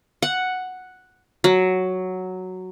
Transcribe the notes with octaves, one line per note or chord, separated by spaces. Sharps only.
F#5
F#3